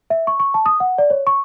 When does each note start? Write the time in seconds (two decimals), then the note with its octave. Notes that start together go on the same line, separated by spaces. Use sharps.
0.10 E5
0.27 C#6
0.40 C#6
0.54 A5
0.66 D#6
0.80 F#5
0.98 D5
1.10 C#5
1.27 C#6